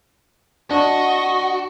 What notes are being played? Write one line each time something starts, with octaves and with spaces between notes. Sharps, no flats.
D4 F#4 D#5 C#6